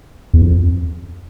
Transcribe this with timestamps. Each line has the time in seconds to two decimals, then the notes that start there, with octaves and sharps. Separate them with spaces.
0.34 E2
0.42 F2